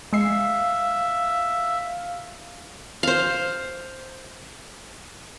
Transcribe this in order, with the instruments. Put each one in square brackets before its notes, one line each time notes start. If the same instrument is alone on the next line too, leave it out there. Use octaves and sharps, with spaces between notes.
[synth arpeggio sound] G#3 C7 [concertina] E5 [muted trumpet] F5
[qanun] C5 F5